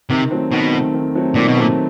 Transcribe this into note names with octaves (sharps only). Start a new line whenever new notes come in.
C3 D#3
F#3 A3 C4
B2 D#3
F#3 A3 C4
D#3
F#3 A3 C4
A#2 D#3
B2
A#2 F#3 A3 C4